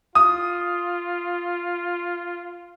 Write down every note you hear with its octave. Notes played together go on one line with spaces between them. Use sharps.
F4 D#6